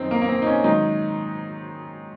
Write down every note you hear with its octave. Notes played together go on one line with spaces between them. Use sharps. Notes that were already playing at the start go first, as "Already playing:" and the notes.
Already playing: F#2 D#3 C4 D#4
A#3
A#3
C4
D#4
C#4
G#2 D#3 F#3 D#4